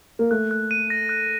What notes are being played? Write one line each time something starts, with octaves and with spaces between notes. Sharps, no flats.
A#3
A3 F#6
F#6
D#7
A#6
F#6